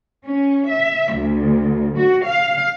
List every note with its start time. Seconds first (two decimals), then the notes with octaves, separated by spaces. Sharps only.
0.25 C#4
0.69 E5
1.14 D2
1.97 F#4
2.26 F5